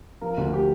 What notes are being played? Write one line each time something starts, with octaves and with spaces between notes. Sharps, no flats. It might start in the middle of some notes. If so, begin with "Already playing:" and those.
F3 A#4
D2
G4